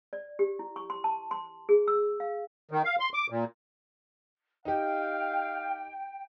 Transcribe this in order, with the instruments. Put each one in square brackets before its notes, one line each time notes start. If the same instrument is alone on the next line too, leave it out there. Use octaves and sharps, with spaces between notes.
[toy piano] D5
G4
E4
C#6
C6
A5
C6
G#4
E6
F5
[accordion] D#3
F5
C6
D6
A#2
[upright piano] D#4 G4 [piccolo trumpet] F5 [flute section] G5